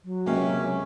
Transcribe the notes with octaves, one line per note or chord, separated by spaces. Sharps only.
F#3
C#2 C3 A#3 C#4 F5